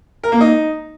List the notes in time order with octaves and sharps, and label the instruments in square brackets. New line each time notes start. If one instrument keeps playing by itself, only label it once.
[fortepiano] A#4
A#3
D#4